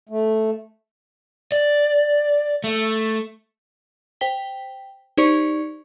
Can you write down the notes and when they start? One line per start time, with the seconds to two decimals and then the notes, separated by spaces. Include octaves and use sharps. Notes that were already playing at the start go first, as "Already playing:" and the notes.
0.09 A3
1.52 D5
2.64 A3
4.21 C5 G5 B6 G7
5.18 D#4 G4 C5 D5 C#6 C#7